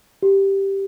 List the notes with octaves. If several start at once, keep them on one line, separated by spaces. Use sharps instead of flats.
G4